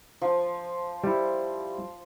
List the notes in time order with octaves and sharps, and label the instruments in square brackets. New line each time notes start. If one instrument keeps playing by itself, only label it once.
[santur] F3
[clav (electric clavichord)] G3 E4